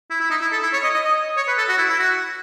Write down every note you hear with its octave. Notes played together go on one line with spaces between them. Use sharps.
E4
E4
D#4
E4
A4
E4
C#5
D#5
D#5
D#5
C#5
B4
A4
F#4
E4
E4
F#4